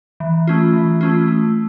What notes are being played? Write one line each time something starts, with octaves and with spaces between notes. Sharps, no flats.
E3
A3 C#4 F4
E3
A3 C#4 F4
A3